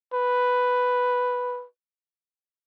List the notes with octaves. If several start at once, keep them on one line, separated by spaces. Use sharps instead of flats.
B4